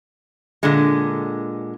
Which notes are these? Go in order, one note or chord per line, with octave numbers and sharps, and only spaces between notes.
A#2 D3 G#3